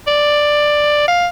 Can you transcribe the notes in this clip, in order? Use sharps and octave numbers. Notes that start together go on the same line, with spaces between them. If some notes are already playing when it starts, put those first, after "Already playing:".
D5
F5